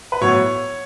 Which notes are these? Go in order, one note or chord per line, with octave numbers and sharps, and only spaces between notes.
B4
A2 F#3 B3 C#5